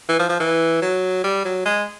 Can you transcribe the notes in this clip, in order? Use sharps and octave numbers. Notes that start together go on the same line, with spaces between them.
E3
F3
F3
E3
F#3
G3
F#3
G#3